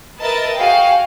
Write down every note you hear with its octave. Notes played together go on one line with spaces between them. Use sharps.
A#4 B4 D#5 E5 A5 A6
F#4 G#4 F5 G5